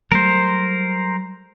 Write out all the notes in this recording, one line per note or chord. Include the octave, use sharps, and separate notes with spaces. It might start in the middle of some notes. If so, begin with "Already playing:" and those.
F#3 G3 A3 A#4 C5